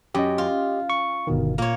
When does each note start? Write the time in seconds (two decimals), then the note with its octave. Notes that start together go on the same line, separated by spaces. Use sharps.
0.15 F#2 G4 D#5
0.38 F4
0.90 C#6
1.27 G1 B2 D#3
1.58 A#2 A#3 C#5